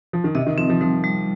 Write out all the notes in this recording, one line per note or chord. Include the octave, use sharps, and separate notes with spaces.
F3
D#3
C3 D#5
D#3
F3 C4
F3
F3 G3
G3